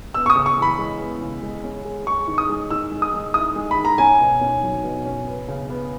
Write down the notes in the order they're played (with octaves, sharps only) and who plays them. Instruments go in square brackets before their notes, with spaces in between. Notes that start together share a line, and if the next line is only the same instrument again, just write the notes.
[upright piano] B3 [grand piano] E6
[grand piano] C#6
D#6
[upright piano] C#3
[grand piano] C#6
[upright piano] E3 [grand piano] B5
[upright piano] G#3
B3
C#3
G#3
C#4
G#4
[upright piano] G#4 [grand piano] C#6
[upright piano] D#3
[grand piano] D#6
[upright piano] G#3
[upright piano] D#3 [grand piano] E6
[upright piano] G#3
[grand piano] D#6
[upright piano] G#3
[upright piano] E4 [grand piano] D#6
[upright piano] G#3
[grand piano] B5
[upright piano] D#3
[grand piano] A#5
[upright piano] C#4 [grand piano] G#5
[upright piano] B2
C#4
F#3
B2
C#4
B3
C#3
B3